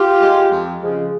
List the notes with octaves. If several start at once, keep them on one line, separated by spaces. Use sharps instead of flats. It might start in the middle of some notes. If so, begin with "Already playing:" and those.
Already playing: F4 G4
G#3
F2
C#3 F3 G#3